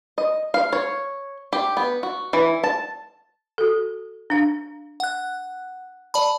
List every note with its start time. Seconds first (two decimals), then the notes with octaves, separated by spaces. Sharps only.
0.18 D#5
0.54 F5
0.73 C#5
1.53 G4
1.77 B3
2.03 F#4
2.33 E3
2.64 A5
3.58 F#4 A4
4.30 D4 F5
5.00 F#5 F#6
6.14 D5 A5 B5